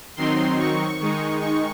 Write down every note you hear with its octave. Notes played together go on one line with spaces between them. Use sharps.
D#3 F#3 C4 D#4 C6
C#6
D#3 G#3 D#4
C#6